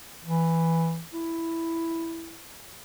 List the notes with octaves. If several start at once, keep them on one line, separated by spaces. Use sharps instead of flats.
E3
E4